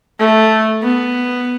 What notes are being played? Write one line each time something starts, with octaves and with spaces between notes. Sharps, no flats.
A3
B3